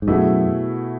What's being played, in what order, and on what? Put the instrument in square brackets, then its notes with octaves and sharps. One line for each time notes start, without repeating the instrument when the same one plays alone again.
[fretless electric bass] G#2
[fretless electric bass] F#2 [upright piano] B2 A3 E4 G#4